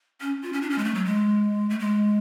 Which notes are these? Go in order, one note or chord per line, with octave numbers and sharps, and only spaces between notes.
C#4
F4
C#4
D4
C#4
G#3
A3
F#3
G#3
A3
G#3